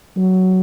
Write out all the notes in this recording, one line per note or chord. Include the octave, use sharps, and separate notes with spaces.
F#3